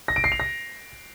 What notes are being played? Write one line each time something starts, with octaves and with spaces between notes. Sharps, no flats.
A#6
D7
C7
F7
A#6